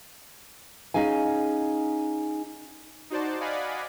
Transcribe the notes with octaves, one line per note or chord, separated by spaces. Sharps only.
C#4 D#4 G#4 F5 G#5
D#4 F#4 C5 D5 A5
D5 D#5 F5 F#5 G#5 B5